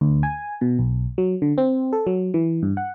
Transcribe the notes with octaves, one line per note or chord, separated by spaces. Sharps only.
D2
G#5
B2
B1
F#3
D3
C4
A4
F#3
E3
G2
F#5